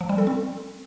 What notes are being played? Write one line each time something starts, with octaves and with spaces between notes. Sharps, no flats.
F3
G3
A4
C4